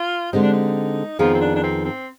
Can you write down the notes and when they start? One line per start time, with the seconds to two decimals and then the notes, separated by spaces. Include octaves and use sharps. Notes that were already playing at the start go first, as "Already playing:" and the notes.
Already playing: F4
0.33 D3 G#3 C4 D#4 G4
0.43 D4
0.53 D#4
1.19 F2 D#3 F3 B3 F4 G#4
1.34 C4
1.41 D4
1.56 D4
1.63 C4
1.85 C4